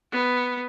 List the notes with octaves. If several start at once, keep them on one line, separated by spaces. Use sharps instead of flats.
B3